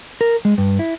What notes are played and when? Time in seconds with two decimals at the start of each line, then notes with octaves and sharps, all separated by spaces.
0.21 A#4
0.45 G#3
0.58 G2
0.79 E4